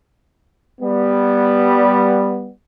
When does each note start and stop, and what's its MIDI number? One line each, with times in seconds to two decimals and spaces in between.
0.81 2.51 55
0.81 2.51 59